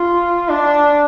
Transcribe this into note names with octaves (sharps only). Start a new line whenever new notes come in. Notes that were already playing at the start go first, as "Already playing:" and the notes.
Already playing: F4
D4